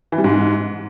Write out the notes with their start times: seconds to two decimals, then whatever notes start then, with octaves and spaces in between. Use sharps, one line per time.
0.12 E3
0.18 G3
0.24 G#2